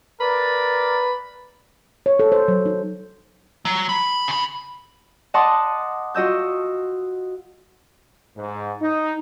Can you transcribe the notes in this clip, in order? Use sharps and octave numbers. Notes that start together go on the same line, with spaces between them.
A#4 B4 D5
C#5
A4
C5
F#3
D#4
F#3
B5
C#3 B5
D#5 F#5 A5 C6 D6 D#6
F4 F#4 D#5 E6 G6
G#2
D#4